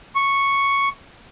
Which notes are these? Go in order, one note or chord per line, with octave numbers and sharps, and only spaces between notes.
C#6